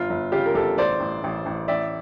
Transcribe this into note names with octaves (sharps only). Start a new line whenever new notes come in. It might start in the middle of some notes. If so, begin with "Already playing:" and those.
Already playing: G1 F4
G1
C#3 F4 G4
A#4
G1 G4 A4
A1 C5 D5
A1
A1
A1
A1 D5 E5